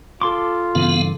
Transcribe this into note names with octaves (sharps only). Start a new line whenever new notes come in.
F4 A4 C6 D6
G2 C#3 E3 B3 F5